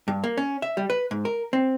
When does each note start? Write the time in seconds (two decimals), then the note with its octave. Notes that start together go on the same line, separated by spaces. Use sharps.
0.08 G2
0.24 A#3
0.37 C#4
0.62 E5
0.77 G3
0.90 B4
1.11 G#2
1.25 A#4
1.53 C4